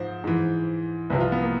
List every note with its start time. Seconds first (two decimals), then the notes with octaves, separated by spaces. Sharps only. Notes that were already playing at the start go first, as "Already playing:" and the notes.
Already playing: G#2 F3 C5
0.24 G#2 E3
1.10 C2 C3 F3 B4
1.20 F4
1.32 B3
1.42 A#3